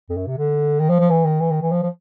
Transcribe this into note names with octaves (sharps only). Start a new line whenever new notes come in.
F2
F#2
C3
D3
D#3
F3
F3
E3
D#3
E3
D#3
E3
F3
F3